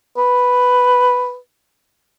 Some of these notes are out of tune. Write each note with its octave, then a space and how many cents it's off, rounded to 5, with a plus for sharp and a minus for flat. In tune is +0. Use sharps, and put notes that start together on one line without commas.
B4 +5